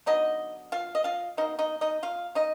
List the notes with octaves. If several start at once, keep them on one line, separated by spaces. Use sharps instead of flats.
D3 F#3 B3 D#4 D#5
F4 F5
D#5
F4 F5
B2 A#3 D#4 D#5
D#4 D#5
D#4 D#5
F4 F5
D#4 D#5